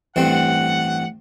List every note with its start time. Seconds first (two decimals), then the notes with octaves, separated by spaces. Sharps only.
0.16 A1 G2 C4 F#5